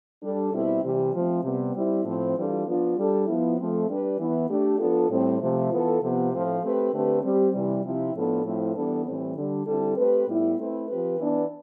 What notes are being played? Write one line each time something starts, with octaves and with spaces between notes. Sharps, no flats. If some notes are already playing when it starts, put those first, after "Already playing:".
G3 D4 A4
B2 G3 C4 E4
C3 E3 G3
F3 A3 C4
C3 G3 B3
G3 C4 E4
A2 F3 C4
E3 G3 D4 F4 A4
F3 B3 D4 F4
G3 D4 A4
F3 B3 E4
F3 A3 C4
G3 D4 G4 B4
E3 B3 E4
A3 D4 G4
F3 B3 D4 F4 A4
A2 G3 C4
C3 F3 A3
E3 B3 F4 A4
C3 F3 B3
A2 F3 A3 C4 F4
A3 C4 G4 B4
D3 A3 C4 G4 B4
G3 C4 G4
C3 E3 G3
C3 F3 C4 E4
A2 F3 B3 D4 A4
A2 F3 A3 C4 E4
E3 G3 B3 D4 A4
A2 E3 G3 C4
D3 G3 D4
D3 G3 C4 E4 A4
A3 C4 G4 B4
A2 G3 B3 E4
A3 C4 E4 B4
F3 C4 G4 B4
E3 B3 D4